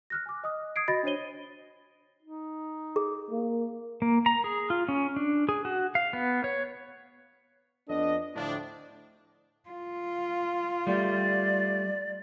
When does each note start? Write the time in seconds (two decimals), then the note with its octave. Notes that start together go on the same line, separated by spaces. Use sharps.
0.10 F6 F#6 A#6
0.26 G#5 D6
0.44 D#5 D#6
0.76 D#6 G#6 C7 D7
0.88 F#4 D#5 B5 A6 A#6
1.03 D4 F#4 C5 C#5 D#7 G7
2.22 D#4
2.96 G#4
3.31 A#3
4.02 A#3
4.26 A#5
4.44 G#4
4.70 F4
4.89 C#4
5.16 D4
5.49 G#4
5.65 F#4
5.95 F5
6.13 B3
6.44 C#5
7.89 F2 B3 D4 A4 D#5
8.36 D2 A2 F3 D4
9.69 F4
10.87 G3 A3 D5